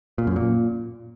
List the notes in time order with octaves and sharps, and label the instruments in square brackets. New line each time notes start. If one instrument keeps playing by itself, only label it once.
[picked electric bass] A#2
F#2
A#2